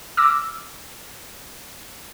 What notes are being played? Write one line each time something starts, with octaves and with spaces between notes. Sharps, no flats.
D6 E6 F6 A#6